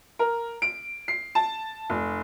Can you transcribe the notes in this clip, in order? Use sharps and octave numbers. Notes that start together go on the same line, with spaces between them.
A#4
D7
C7
A5
F1